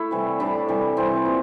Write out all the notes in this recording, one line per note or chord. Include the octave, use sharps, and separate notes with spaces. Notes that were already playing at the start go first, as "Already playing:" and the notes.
Already playing: A3 E4
C3 E3 G3
A2 G3 D4
C3 E3 G3
C3 E3 G3 C4
A#2